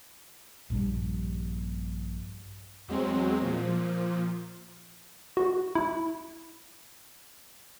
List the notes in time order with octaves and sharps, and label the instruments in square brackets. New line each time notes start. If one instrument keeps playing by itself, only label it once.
[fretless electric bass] A#1 G2 G3
[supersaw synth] E2 F#3 G#3 C4
A#2 F3
[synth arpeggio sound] F#4
E4